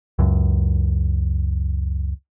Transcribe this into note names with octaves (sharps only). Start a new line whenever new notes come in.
C#2 F#2